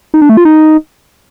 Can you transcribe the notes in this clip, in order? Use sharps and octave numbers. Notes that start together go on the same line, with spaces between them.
D#4
D4
A3
F4
D#4